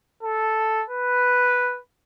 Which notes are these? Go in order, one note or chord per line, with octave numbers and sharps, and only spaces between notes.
A4
B4